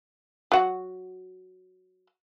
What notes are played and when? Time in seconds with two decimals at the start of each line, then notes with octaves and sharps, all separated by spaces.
0.52 F#3 F#4